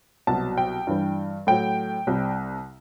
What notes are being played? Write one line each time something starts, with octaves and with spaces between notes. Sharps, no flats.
C2 B2 F#3 A5
G5
G2 E3 G3
A2 F#3 G5
C2 C3 G3